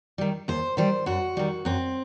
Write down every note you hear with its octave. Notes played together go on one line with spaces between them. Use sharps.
D#3 G3
D#2 C5
D#3 G3 C5
F#2 F#4
D#3 G3
F#2 C4